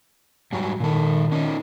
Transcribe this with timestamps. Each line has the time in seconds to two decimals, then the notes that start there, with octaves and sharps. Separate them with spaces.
0.53 G#2 F#3 G3
0.80 A#2 D#3 A4
1.32 C#4 D#4